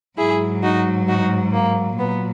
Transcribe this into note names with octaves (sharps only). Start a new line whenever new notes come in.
G#2 F#3 E4 G#4
D#4 F#4
D#4 F#4
A#3
A#2 F#3 B3